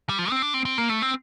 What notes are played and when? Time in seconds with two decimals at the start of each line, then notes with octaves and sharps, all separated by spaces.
0.09 G3
0.19 F3
0.30 C4
0.42 D4
0.54 C4
0.65 C4
0.78 A#3
0.90 A3
1.02 C4